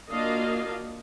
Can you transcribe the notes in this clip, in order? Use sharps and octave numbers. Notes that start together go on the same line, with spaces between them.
A#3 D4 F4 F#4 D#5 F5